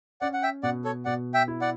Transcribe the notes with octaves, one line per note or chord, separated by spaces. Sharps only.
C#4 D5 F#5
F#5
E5 G5
B2 D5 F#5
A4 C#5
B2 D5 F#5
E5 G5
E4
D5 F#5